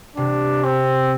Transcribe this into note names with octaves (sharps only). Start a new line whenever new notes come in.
C3 D4
C4